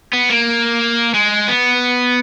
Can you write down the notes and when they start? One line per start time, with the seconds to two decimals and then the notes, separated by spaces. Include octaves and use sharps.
0.13 B3
0.30 A#3
1.14 G#3
1.48 B3